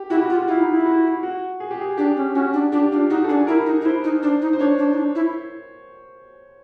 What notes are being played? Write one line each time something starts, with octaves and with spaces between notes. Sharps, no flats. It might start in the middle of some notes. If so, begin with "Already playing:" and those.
Already playing: G4
E4 F#4
G4
F#4
F4
F#4
E4 F4
D#4
E4
F#4
F#4
G#4
G4
G#4
D4 G4
C#4
C#4 F#4
D4
D4 G4
D4 F4
D#4 F#4
A4
D4 G#4
E4 A#4
D#4
D#4
E4 C5
D#4
D4 C5
D#4
C5
D4 C#5
D4
D#4
D4
E4